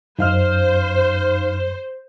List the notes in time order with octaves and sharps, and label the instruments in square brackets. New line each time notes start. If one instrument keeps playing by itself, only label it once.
[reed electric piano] F#2 [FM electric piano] D#4 F5 F6 [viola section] C5